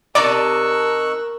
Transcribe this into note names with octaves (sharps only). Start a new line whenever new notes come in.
C3 D#4 A#4 D5 A5 C#6 E6 F#6